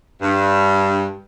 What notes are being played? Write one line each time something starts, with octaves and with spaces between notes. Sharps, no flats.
G2